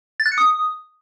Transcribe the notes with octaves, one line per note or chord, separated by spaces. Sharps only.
A6
F#6
C#7
D#6